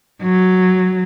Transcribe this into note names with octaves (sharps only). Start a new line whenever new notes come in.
F#3